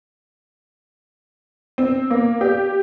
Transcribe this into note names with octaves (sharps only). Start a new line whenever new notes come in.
C4
A#3
G4